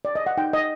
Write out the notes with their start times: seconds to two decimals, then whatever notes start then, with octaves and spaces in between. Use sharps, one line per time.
0.05 D5
0.15 D#5
0.26 F#5
0.37 D#4 G5
0.53 D#5